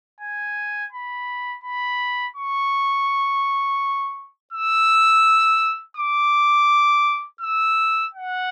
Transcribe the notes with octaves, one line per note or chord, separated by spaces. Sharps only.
G#5
B5
B5
C#6
E6
D6
E6
F#5